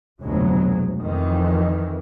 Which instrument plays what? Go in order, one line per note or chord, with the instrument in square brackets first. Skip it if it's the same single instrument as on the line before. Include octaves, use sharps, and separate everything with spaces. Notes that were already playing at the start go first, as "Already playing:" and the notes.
[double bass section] F1 D2 B2 F#3 G#3
F2 D#3 E3